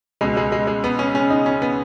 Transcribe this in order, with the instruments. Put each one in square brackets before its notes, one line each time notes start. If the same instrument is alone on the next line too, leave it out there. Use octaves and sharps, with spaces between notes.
[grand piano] C#2 B2 G#3
G#3
G#3
G#3
B3
C#4
C#4
D#4
C#4
B3